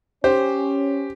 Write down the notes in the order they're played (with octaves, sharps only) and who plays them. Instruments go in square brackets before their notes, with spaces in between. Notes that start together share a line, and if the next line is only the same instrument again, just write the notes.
[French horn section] C#4 [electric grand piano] G4 [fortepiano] C5